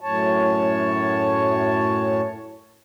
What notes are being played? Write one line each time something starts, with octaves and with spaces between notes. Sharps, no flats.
F#2 A2 C#5 A5